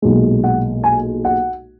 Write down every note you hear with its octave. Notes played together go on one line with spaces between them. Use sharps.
B1 A#2 G#3
F#5
G#5
F#5